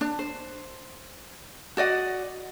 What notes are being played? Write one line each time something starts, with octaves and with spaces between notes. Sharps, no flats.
D4
C5
F#4 D5 D#5 F#5